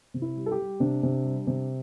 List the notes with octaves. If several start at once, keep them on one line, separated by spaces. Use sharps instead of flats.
C3
E4
G3
A4
G4
G3
C3 D4
C3
G3
C3